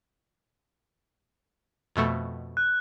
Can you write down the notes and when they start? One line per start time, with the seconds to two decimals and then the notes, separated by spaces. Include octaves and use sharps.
1.96 F2 B2 A3
2.57 F#6